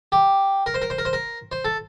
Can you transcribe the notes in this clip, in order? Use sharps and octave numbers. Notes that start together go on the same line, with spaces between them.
G4
A#4
C5
A#4
C5
A#4
C5
A#4
C5
A4